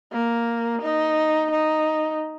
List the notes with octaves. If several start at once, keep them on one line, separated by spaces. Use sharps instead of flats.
A#3
D#4
D#4